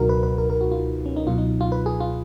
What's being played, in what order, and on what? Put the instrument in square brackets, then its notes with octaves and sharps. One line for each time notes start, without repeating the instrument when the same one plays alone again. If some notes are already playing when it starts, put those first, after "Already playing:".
Already playing: [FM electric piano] C#2 B2 F#3 D#4 F#4 A#4
B4
B4
A#4
A#4
F#4
F4
C#4
D#4
C#2 B2 F#3 F4
D#4
F4
B4
G#4
F4